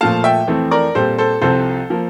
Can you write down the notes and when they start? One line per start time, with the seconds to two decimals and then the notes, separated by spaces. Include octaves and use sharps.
0.01 A#2 F3 A3 F5 A5
0.24 E5 G5
0.47 F2 E3 A3 C4
0.71 A#4 D5
0.95 A#2 G3 C4 A4 C5
1.18 A4 C5
1.41 C2 C3 F3 C4 A4 C5
1.90 F3 A#3